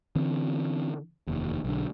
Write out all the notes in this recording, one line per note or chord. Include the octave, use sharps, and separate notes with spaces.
D3 E3 C4
F1 D#2
B1 D3